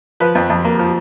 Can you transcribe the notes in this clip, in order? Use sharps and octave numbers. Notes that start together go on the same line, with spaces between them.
F3 B4
F2
F2
A#3
F3